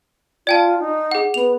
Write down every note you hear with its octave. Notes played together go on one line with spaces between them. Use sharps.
F4 D5 G5 A5
D#4
G#4 F#5
B3 F7